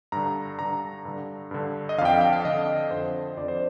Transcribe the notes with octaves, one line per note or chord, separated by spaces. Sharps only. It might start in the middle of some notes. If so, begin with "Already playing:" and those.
G2 D3 A#5
G2 D3 A#5
G2 D3
G2 D3
D#5
F2 D3 F5 G5
F5
G5
F5
F2 D3 D#5
F2 D3 C5
F2 D3 D5
C5